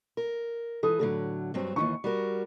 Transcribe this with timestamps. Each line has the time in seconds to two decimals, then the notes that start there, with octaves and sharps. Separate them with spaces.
0.17 A#4
0.83 E3 A4 D#6
0.99 A2 D3 F#3 A4
1.54 G2 F#3 C4
1.76 D#2 D#3 E3 C#6
2.04 G3 F#4 A#4